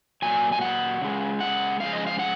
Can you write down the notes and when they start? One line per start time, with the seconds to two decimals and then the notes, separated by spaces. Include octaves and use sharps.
0.22 A#2 F#3 G#5
0.52 G#5
0.61 F#5
1.01 C#3 G#3
1.41 F#5
1.80 C#3 F3 G#3 F5
1.93 D#5
2.07 F5
2.19 F#5